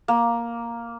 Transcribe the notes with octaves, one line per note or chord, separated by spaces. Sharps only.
A#3